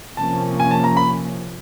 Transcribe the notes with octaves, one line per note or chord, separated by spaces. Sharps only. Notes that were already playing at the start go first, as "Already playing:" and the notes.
C3 F3 A#3 C#4 A5
G#5
A5
A#5
B5